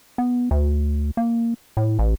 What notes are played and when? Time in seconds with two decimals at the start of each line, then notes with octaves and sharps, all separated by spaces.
0.18 B3
0.51 D2
1.17 A#3
1.77 A2
1.99 A1